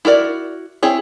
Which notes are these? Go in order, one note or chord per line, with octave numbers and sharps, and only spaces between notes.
E4 F#4 A#4 D5
C4 E4 G#4 C#5